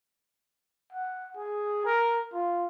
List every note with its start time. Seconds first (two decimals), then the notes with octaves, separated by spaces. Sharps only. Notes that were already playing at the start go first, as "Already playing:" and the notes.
0.93 F#5
1.36 G#4
1.85 A#4
2.33 F4